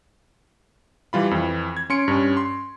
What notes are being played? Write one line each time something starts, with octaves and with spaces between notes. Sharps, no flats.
E3 G3 F4 B5
F2 E3
G#6
C#4 C6 C#7 D7
G2 C#4
C6